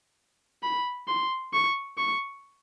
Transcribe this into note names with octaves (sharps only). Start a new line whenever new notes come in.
B5
C6
C#6
C#6